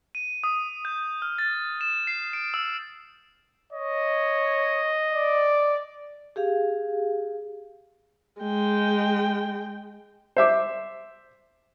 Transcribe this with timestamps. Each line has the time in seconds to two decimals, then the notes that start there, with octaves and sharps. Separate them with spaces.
0.15 D#7
0.44 D#6
0.85 G6
1.22 F6
1.38 A6
1.81 E7
2.07 C7
2.33 D7
2.54 E6
3.73 C#5 D#5
5.13 D5
6.36 G4 G#4 F5
8.41 G#3 G5
10.37 C5 E5 D6